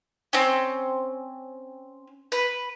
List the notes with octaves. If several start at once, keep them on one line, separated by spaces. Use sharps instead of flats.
C4 C#4
B4